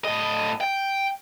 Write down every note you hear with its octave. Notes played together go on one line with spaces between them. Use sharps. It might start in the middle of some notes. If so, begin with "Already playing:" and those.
A2 D#5
G5